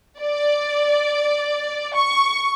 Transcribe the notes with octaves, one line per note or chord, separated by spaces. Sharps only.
D5
C#6